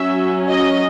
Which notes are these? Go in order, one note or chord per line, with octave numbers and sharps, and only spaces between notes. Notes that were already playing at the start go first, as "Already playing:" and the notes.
Already playing: F#3 C#4 E5
D#5